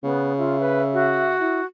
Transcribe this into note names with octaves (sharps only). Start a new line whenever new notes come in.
C#3 B3
F4 E5
B4
F#4
E4